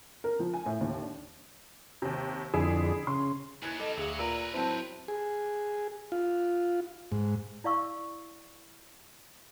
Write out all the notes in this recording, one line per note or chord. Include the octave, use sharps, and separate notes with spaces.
A#4
F3
G#5
A2
D#2
D4
D#2 C3
F2 D3 E4 G#4
C#3 C6
D#2 E4 G#5 F#6 G#6
G3 C4 A4 D#5
D2 F#3 G#4 F5
A#2 A#4 B4 A#5 E6
F#3 C4 E4 C5 A5
G#4
F4
G#2
E4 D5 F5 C#6 E6